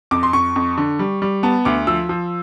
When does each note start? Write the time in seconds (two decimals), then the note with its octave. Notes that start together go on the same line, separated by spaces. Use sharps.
0.11 F2 D6
0.23 C6
0.33 F2 C#6
0.56 F2
0.78 D3
0.99 G3
1.22 G3
1.43 B3 A5
1.65 D2 D6
1.87 F3 E6
2.09 F3